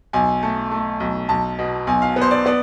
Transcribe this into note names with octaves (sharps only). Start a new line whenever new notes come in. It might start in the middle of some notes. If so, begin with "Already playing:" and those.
B1 G#5
A3
A3
B1
B1 A5
B2
B1 G#5
F5
B3
C5
D5
B3 D5